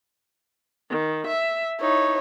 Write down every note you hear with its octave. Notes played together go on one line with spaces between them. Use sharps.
D#3
E5
D#4 E4 C#5